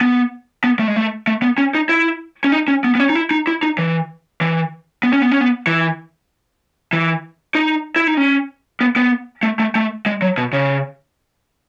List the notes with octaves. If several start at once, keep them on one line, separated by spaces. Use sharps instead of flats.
B3
B3
A3
G#3
A3
A3
B3
C#4
D#4
E4
C#4
D#4
C#4
B3
B3
C#4
D#4
E4
D#4
E4
D#4
E3
E3
B3
C#4
B3
C#4
B3
E3
E3
D#4
E4
D#4
C#4
B3
B3
A3
A3
A3
G#3
F#3
B2
C#3